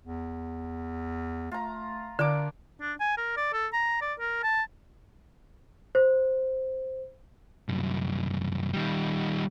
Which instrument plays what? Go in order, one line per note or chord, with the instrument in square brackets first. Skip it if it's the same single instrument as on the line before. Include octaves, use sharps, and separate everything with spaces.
[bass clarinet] E2
[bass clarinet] A3 [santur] F4 A#5
[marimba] D3 [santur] A#3 D4 D6
[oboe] D4
G#5
A#4
D5
A4
A#5
D5
A#4
A5
[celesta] C5
[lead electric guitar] C2 F#2
D#3 G3